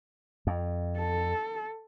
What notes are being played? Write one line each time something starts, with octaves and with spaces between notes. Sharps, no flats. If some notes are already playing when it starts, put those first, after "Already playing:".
F2
A4